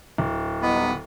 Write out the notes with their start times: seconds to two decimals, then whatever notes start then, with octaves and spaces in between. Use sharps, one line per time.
0.18 D1
0.62 G3 B3 D#4 E4